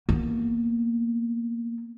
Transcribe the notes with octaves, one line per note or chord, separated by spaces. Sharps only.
A#3 B3